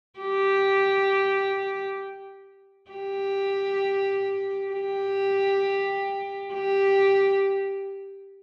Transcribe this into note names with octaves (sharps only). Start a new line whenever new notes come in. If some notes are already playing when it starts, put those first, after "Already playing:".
G4
G4
G4
G4